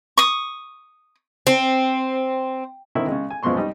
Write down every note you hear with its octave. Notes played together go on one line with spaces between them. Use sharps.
C#6 D#6
C4
D3 D#3 C4 E4
C#3 G#3
G#5
F#2 F3 G#3 B3 C6 C#6
G3 D#4